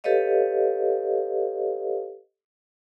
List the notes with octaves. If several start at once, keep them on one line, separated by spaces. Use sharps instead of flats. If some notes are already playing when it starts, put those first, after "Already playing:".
G4 A4 B4 C#5 D#5 F5